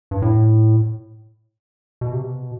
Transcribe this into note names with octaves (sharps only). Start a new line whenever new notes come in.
G2
A2
B2
C3
B2